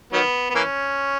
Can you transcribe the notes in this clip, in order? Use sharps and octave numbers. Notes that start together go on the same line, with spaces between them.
D#3 F#3 B3
B3
E3 A#3 C#4